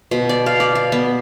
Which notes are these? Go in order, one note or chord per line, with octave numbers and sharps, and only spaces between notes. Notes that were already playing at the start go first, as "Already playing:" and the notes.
B2
D5
F5
D5
F5
B3